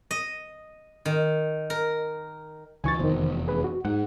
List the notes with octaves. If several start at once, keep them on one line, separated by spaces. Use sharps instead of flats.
D#5
D#3
A#4
C#2 E3 G#5 C#6 A6
F1 E2 D#3 C5
G#4 B4
F#4
G#2 F#5